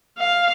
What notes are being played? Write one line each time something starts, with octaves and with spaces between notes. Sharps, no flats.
F5